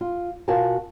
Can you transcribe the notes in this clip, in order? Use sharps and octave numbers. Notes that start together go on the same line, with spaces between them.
F4
B2 F4 F#4 A#4 G#5 A5